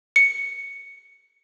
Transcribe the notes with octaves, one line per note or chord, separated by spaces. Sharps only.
C#7